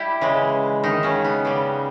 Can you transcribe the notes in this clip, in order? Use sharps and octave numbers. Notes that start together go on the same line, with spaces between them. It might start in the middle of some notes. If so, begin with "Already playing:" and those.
Already playing: G3 E4 G4
C#3 E3 G#3
D#3 D#4
C#3 C#4
B3
C#3 G3